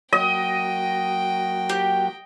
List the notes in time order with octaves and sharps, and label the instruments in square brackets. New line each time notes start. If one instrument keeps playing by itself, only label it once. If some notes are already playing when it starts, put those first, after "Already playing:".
[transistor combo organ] F#3 A#3 F#4 [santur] D#5 [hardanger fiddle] G5
[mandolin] G4